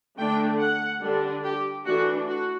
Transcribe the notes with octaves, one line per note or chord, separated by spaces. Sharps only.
D3 A3 D4 G5
F#5
D3 G3 D4
G4
E3 A3 D4 F#4
F#4